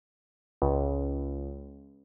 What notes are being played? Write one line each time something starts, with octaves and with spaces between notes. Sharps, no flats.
C#2